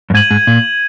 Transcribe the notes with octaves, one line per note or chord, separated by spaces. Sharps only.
F#2
G#2 G#6 D#7 F#7
G#2
A#2